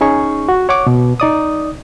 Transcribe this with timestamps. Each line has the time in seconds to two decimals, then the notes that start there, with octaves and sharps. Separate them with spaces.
0.01 C#4 D#4 G#4 C#6
0.49 F#4
0.69 C#5 F#5 C#6 D6
0.87 B2
1.20 D#4 D5 D#6